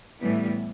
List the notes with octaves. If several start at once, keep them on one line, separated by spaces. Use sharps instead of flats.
A2 E3 G3 B3